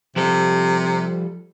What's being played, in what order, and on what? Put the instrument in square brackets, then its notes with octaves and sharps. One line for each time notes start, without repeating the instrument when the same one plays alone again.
[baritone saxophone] C3 [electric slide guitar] F3 G3 A4